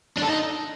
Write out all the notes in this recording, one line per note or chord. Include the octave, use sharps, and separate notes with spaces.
D4
A4
D#4